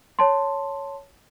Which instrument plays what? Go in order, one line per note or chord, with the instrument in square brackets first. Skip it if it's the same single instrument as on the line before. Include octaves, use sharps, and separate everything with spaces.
[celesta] C#5 A5 C6